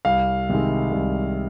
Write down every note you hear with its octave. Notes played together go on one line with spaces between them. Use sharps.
C2 F5
C3 D#3 G#3
C2